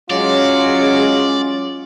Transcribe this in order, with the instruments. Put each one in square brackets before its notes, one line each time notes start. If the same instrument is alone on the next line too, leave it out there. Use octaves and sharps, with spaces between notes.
[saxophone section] F#3 G#3 [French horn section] C#4 [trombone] F4 [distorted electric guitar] D5